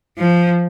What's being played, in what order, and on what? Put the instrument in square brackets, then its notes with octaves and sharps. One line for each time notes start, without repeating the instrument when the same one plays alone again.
[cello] F3